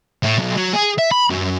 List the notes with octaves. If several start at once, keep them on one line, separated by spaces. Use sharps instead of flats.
A2
B1
F#3
G#4
E5
B5
F#2